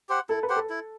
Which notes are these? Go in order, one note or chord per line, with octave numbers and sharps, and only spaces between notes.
G4 C5 F#5
E4 A4
B4
G4 C5 F#5
A4
E4